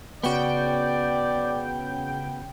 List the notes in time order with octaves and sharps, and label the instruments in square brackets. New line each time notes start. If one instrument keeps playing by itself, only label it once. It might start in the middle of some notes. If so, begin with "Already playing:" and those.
[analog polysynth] C#3 G5 [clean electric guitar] B3 F#4 [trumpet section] D5